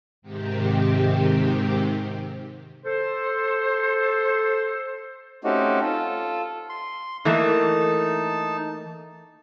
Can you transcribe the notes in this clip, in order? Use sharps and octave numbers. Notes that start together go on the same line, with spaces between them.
G#2 C3 D#3 C4 G4
A4 C5
A3 C4 C#4 D#4 F#4 G4
F4 A4
C6
E3 A3 A#3 D#4 A5